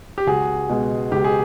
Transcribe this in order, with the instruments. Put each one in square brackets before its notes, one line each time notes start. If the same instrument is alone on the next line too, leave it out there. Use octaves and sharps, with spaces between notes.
[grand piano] G4
C#2 F#4 G#4
B2 G#3
C#2 G4
G#4